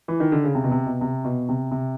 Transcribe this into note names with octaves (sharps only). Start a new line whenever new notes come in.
E3
D#3
D3
C#3
C3
B2
C3
B2
C3
B2
C3
C3